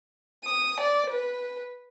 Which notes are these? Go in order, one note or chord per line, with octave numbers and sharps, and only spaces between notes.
D#6
D5
B4